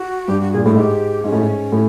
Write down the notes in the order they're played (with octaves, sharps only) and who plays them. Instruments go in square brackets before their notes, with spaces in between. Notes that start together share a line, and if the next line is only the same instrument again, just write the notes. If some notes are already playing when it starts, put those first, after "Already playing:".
Already playing: [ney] F#4
[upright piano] G2 [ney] G4
[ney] F#4
[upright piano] A#2 [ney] G#4
[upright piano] A2 [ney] A#4
[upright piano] G#2 [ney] G4
[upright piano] G#2 [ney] C#4
[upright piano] A2
G#2
A2